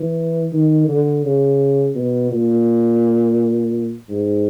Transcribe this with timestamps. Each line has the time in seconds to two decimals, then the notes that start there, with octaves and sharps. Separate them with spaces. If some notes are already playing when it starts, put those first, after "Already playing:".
Already playing: E3
0.52 D#3
0.88 D3
1.24 C#3
1.95 B2
2.31 A#2
4.09 G#2